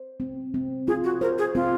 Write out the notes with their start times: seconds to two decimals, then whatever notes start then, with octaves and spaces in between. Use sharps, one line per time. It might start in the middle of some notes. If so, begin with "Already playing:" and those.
Already playing: C5
0.20 C4
0.54 C4
0.88 F4 G#4
1.04 F#4
1.21 A#4 C5
1.39 G#4
1.55 C4 F4